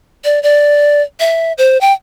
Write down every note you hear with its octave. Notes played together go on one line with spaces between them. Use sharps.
D5
D5
E5
C5
G5